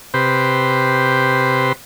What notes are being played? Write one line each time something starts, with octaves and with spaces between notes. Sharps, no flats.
C3 G4 B4 C5